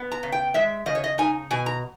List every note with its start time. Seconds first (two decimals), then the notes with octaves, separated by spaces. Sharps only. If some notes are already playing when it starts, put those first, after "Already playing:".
Already playing: B3
0.12 A#5
0.23 C#3
0.32 G5
0.54 G#3 E5
0.86 C#3 D#5
0.95 C#5
1.04 D#5
1.18 D#4 G#5
1.51 B2 G#5
1.66 A#5